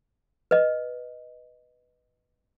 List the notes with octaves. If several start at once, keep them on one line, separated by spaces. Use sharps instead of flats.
B4 D#5